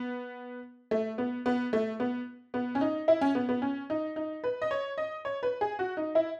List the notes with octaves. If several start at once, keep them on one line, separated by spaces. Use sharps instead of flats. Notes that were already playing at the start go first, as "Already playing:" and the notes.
Already playing: B3
A3
B3
B3
A3
B3
B3
C#4
D#4
E4
C#4
B3
B3
C#4
D#4
D#4
B4
D#5
C#5
D#5
C#5
B4
G#4
F#4
D#4
E4